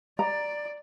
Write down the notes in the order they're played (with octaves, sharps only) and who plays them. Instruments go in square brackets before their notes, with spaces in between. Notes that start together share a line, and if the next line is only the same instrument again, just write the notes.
[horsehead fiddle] D5 [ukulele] A#5